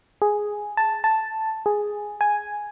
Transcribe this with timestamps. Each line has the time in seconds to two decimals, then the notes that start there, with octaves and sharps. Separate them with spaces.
0.22 G#4
0.77 A5
1.04 A5
1.66 G#4
2.21 G#5